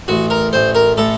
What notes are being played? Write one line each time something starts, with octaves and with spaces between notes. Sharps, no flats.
A1 F#4
A#4
A1 C5
A#4
A2 A4